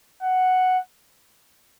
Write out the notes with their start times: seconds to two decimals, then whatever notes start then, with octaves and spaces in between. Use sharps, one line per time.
0.22 F#5